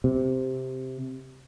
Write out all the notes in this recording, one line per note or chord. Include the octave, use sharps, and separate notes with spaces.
C3